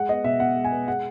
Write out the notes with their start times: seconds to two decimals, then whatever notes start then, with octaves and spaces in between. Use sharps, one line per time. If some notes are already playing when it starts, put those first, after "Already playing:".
Already playing: G#3 F#5
0.09 B3 D#5
0.24 B2 E5
0.40 B2 F#5
0.56 G#3
0.65 G#5
0.72 B3
0.88 G#3 F#5